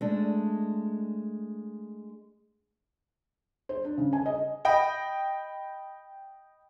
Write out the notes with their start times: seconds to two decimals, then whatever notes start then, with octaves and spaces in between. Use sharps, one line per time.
0.01 G#3 A3 D4
3.69 C5
3.84 D4
3.98 C#3
4.13 G#5
4.26 D#5
4.65 D#5 G5 B5